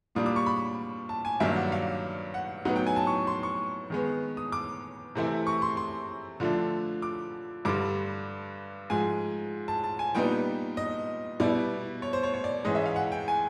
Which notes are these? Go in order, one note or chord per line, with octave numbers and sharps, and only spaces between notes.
A#2 G3 A#3 D4 D#6
D6
C#6
B5
A5
G#5
G2 D#3 F#3 A#3 D4 E5
F#5
F5
F#5
A2 F#3 B3 D#4 F#5
G5
G#5
A5
C#6
C6
C#6
D#3 G#3 B3
D#6
D6
C3 E3 A3 C4 E4
C#6
C6
C6
D3 F3 A3 D4
D6
G2 D3 G3 D6
G#2 F3 G#3 G#5
A5
A5
G#5
A#2 G3 B3 D#4 G5
D#5
B2 G3 B3 E4 D5
C#5
C5
C#5
C#5
D5
G#2 E3 G#3 C#4 D#5
E5
F5
F#5
G5
G#5